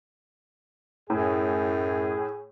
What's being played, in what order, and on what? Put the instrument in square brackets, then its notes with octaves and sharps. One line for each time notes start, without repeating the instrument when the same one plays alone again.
[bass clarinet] F#2 [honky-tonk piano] A2 [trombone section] G#4